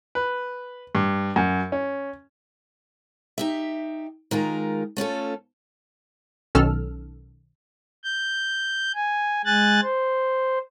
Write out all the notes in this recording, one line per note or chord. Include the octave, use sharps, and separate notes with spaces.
B4
G2
F#2
C#4
D#4 G4 E5
D#3 G#3 F4 A#4
A3 C#4 F4 A4
B1 D#3 C#4 A4 E6 F6
G6
G#5
G#3 G#5 F#6 A6
C5